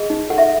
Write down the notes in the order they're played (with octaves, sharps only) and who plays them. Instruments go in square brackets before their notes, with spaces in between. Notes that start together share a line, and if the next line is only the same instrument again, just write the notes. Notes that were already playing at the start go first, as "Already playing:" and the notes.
Already playing: [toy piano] G#4 D#5
D#4
A4 F#5
E5